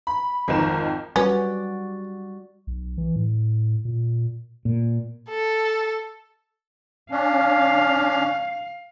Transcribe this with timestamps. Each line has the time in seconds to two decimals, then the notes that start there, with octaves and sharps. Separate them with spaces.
0.07 B5
0.48 G#1 F2 D#3 D#4 A#4 E7
1.16 G3 C#4 F#4 B4 D5
2.67 B1
2.98 E3
3.16 A2
3.85 A#2
4.65 A#2
5.30 A4
7.11 C#4 D4 F5